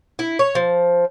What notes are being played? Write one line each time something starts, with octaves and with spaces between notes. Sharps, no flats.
E4
C#5
F3